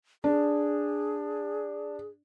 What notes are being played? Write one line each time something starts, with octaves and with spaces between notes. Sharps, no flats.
D4 G#4